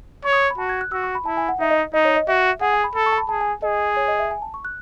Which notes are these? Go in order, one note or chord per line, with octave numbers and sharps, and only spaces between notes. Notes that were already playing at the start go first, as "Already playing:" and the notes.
C#5 C#6
D#6
B5
F#4 A5
G#6
F#6
F#4 E6
C#6
B5
E4 A5
G#5
F#5
D#4 E5
D#5
D#4 D#5
C#5
D#5
F#4 E5
G#4 F#5
G#5
B5
A4 B5
C#6
A5
B5
G#4 A5
G#5
G#4 D#5
C#5
D#5
E5
G#5
A5
C#6
F#6